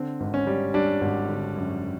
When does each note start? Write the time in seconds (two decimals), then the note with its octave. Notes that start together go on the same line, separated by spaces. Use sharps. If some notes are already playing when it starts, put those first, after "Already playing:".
Already playing: D3 C4
0.20 G#1
0.34 C#4
0.47 G3
0.74 G3 D4
1.01 G#1
1.29 D3
1.56 F#2